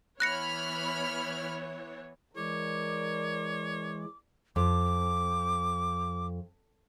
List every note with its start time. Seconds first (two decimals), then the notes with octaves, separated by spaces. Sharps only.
0.20 E3 B3 C#5 B5 F6 F#6 A#6 C#7
2.37 E3 G#3 A#4 C#5 D5 D6
4.56 F2 D6